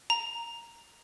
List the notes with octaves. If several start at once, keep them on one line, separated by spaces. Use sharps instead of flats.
A#5